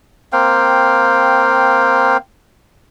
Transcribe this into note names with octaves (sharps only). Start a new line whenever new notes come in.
A#3 C4 F5 G5